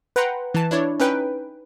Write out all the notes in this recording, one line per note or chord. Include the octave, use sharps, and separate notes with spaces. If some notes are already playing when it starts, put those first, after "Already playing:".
B4 F#5 G5 A#5 C6
E3 A5
D4 E4 C#5 D5
C#4 D#4 B4 G5